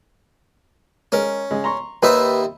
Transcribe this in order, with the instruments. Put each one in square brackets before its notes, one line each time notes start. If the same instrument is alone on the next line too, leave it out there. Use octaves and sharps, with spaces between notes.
[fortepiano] G#3 A#4 [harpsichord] C#4
[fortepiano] C#3 G#3
A#5 C6 C#6
[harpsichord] D#2 D#4 E5 [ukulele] B4 [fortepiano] C5